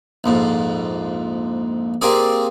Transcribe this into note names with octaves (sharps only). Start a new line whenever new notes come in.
A#1 F2 G#2
A#3 C4 G4 G#4 D5